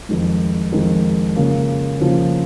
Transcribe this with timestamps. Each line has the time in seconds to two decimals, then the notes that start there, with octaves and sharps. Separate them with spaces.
0.09 F2 D#3 G#3
0.72 F2 D#3 G#3
1.36 C#3 F3 A#3
2.00 C#3 F3 A#3